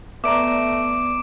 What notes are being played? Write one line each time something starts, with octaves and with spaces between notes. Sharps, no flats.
A3 B3 D5 A#5 D6 D7